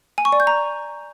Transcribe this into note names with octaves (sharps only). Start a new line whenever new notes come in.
G#5
C#6
D5
G6
A#5